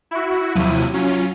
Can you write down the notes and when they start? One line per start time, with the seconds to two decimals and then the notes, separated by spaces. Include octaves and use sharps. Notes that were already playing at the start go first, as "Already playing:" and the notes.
0.11 E4 F#4
0.55 D#2 C3 F3 F#3 E4 D#7
0.93 F#3 C#4 F4